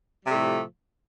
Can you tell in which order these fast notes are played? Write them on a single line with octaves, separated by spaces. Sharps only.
G3 C3 A3 A2 F3